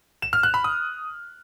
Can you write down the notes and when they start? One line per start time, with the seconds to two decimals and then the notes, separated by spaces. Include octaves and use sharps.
0.22 E7
0.33 F6
0.43 F#6
0.54 B5
0.64 D#6